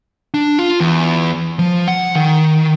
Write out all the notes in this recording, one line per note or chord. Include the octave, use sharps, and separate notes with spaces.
D4
F4
E2
F3
F#5
D#3